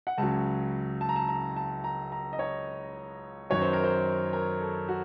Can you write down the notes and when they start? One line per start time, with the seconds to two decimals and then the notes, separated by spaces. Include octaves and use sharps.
0.07 F#5
0.18 C#2 C#3 F#3 A5
1.01 A5
1.09 A#5
1.16 A5
1.29 A#5
1.57 A5
1.84 A#5
2.12 A#5
2.33 D#5
2.39 C#5
3.50 F#2 D#3 F#3 C#5
3.62 C5
3.73 A#4
3.84 C5
4.33 A#4
4.61 A4
4.88 F#4